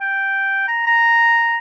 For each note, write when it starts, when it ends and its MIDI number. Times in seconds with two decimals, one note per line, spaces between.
0.01 0.68 79
0.68 0.84 82
0.87 1.57 82